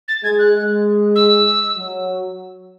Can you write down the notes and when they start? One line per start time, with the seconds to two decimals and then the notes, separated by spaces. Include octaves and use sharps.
0.08 A6
0.23 G#3 G#6
0.39 F#6
0.54 G#3
1.15 E6
1.77 F#3